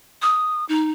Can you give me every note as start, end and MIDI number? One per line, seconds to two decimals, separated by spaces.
0.22 0.65 87
0.69 0.92 63